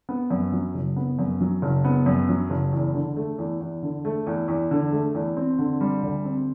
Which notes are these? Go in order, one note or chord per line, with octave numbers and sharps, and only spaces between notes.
B3
F#2
F#3
F#1
B3
F#2
F#3
F#1
B3
F#2
F#3
F#1
E2
D3
A3
E2
E2
D3
A3
E2
E2
D3
A3
E2
C4
D3
G3
D2
C4